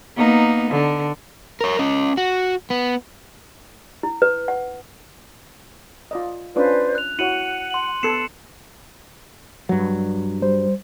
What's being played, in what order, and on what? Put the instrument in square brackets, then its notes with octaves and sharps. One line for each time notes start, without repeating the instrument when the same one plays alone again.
[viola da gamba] A#3 B3 D#4
D3
[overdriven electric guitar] A#4 C#5
C#4 D#5
F#4
B3
[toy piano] E4
B4
F#5
[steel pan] F4 D5 D#5
[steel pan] C#4 D4 F4 [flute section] B4 C5 D5
[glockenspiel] F#6 F7
[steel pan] E4 F#4 C#5 [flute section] F#5 [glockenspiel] C#7 D#7 F#7
[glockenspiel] C6 F#7
[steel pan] B3 A4 [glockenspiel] C7 C#7 E7
[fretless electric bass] G2 F#3
[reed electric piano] G3 C5